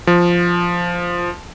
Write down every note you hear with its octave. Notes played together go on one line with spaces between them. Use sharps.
F3